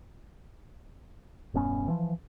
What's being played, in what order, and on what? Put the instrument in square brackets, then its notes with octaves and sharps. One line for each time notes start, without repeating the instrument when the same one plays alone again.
[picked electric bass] E1 G2 B3 C#4
E3 F3